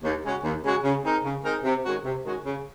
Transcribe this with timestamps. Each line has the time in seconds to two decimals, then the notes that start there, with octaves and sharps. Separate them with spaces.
0.03 D#2
0.23 C#3 G#3 C#4 F#4
0.44 D#2
0.64 C#3 G#3 C#4 F#4
0.84 C#3
1.04 G#3 C4 D#4 A#4
1.24 C#3
1.44 G#3 C4 D#4 A#4
1.64 C3
1.84 D#3 G#3 C#4 F#4
2.05 C3
2.25 D#3 G#3 C#4 F#4
2.45 C#3